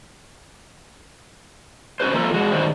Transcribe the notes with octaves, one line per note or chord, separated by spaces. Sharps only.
C#4 F#4 B4 C5
F3 A#3 F4 A4
G#3 F#4
G2 D#3 D4 F#4 C5